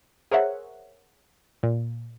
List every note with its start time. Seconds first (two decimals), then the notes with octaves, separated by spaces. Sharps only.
0.31 G#4 A#4 C5 C#5 E5 F#5
1.63 A#2